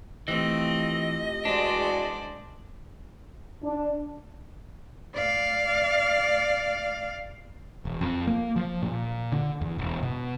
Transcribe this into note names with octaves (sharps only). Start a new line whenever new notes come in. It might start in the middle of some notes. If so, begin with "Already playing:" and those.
E3 F3 A3 C4 G4 D#5
E2 G#3 D4 F#4 C5 D5
D4
D5 F5
E1
F2
A#3
F3
A#2
D3
E2
E1
B2